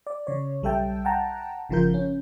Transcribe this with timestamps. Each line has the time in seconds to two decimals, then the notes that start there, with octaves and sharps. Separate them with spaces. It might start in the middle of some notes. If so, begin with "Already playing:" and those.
0.07 D5
0.27 C#3 C#5
0.62 B1 G3 A4 E5 G5 A5
1.05 F#5 G5 A5 A#5
1.69 G1 C#3 F3 F4 A#4 G6
1.94 C#4